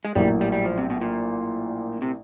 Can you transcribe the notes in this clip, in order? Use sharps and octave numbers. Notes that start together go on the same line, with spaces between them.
G#3
A#1 A2 F#3 G3 A#3
G3
G3
F3
C3
B2
A#2
C3